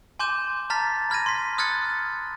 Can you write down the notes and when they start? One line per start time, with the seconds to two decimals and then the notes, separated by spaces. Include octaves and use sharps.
0.19 G#5 C6 D6 G6 E7
0.70 A5 A#5 F6 A6 B6
1.10 B5 F6 G#6 A#6 D#7
1.26 C6 B6
1.58 D#6 F6 F#6 G#6 A6 C#7